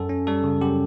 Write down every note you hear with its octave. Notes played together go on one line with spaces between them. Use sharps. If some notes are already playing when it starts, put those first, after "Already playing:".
Already playing: F#2 A4
C#4
G3 A4
C#3
F#2 G4